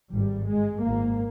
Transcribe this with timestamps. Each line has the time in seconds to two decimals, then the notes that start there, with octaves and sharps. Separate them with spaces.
0.11 G#1 G2 G3
0.47 G#3
0.83 G#1 G#2 A#3